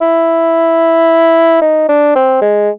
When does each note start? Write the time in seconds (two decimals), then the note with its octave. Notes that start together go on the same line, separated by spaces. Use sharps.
0.01 E4
1.62 D#4
1.89 D4
2.16 C4
2.42 G#3